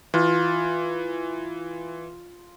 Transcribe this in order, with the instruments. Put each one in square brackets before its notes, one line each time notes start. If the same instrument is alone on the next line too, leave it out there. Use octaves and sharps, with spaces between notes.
[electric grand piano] E3 [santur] F4